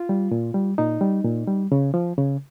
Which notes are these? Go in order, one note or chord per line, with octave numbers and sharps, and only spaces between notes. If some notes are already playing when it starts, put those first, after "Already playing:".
Already playing: F4
G3
A#2
G3
A#2 D#4
G3
A#2
G3
C#3
F3
C#3